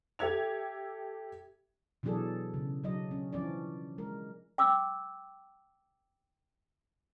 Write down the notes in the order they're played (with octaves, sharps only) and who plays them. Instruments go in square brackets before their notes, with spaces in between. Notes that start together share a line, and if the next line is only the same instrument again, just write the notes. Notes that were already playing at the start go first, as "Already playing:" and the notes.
[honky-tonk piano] G4 A4 E5 G#6 F7
[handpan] B2 E3 F#3 D4 G#4 A4
C#3
F#3 D4 D#5
C#4
E3 F3 C#4 D4 D5
G#3 A#4
[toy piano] G5 D6 E6